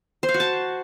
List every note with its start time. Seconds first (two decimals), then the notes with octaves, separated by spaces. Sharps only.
0.23 C5
0.29 F5
0.34 F#4
0.40 A5